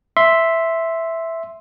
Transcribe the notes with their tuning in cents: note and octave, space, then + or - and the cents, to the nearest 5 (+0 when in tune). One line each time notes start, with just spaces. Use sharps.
E5 +0 C6 +0